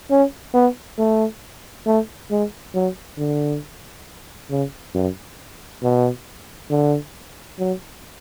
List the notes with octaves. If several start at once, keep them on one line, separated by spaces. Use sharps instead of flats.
C#4
B3
A3
A3
G#3
F#3
D3
C#3
F#2
B2
D3
F#3